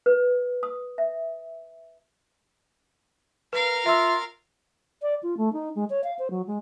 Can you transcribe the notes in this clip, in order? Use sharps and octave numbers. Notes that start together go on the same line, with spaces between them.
B4
D#6
E5
A#4 B4 F5
F4 E5 E6
D5
F4
A3
D#4
G#3
C#5
F5
C5
F#3
G#3